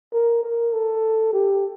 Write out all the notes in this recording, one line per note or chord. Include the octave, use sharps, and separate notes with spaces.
A#4
A#4
A4
G4